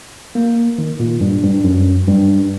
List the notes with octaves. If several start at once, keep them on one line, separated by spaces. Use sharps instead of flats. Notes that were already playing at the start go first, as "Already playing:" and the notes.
A#3
D#3
A#2
G2
G2
F#2
G2